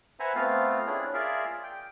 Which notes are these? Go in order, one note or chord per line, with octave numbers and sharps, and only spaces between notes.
B4 C5 E5 F#5 G#5 A#5
A3 B3 C4 F4 F5
C#4 D4 E4 G#4
F4 G#4 A#4 D5 E5 F5
G5